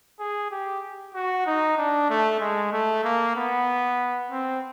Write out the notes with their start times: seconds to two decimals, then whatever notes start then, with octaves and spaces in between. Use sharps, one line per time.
0.20 G#4
0.51 G4
1.15 F#4
1.46 D#4
1.78 D4
2.10 A3
2.40 G#3
2.73 A3
3.04 A#3
3.36 B3
4.31 C4